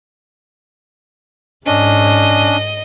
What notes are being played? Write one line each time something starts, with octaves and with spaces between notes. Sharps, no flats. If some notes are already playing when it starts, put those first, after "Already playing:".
G#2 C#4 D4 D#5